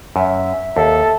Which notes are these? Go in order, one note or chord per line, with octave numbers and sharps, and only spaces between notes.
F#2 E5
D#2 A4